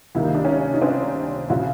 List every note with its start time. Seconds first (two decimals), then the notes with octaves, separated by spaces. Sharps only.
0.15 C#2 C3 D#3 G3 A#3 E4
0.24 D#4
0.35 D4
0.45 C#4 D#4
0.74 D#4
0.82 C4 D4
1.50 C#3 F3 E4 F#4